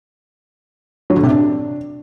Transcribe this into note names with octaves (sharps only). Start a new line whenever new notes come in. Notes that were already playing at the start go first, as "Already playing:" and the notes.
F#3
D3
C3
D4